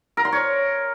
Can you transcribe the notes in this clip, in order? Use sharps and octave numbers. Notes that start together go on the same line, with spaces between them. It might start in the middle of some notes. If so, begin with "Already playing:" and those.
A#4
C6
C#5